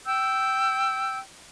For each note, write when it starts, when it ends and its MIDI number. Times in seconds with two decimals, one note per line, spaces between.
0.06 1.19 79
0.06 1.19 88
0.06 1.19 91